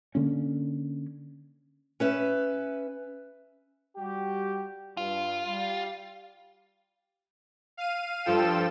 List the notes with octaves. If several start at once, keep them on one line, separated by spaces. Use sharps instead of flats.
D3 A#3 C#4
C#4 B4 E5
G3 F#4 G4
G2 F4
G3
F5 D#7
G2 F3 F4 A4 G5 E7